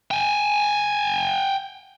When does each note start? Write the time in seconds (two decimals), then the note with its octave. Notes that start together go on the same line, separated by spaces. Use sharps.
0.11 G5 G#5